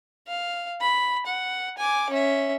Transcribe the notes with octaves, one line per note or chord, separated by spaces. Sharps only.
F5
B5
F#5
G#5 D6
C#4 E5